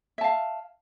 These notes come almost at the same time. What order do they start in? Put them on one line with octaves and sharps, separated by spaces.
E5 A5 F5